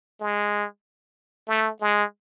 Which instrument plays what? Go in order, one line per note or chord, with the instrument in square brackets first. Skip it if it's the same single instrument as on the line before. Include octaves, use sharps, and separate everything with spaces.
[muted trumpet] G#3
A3
G#3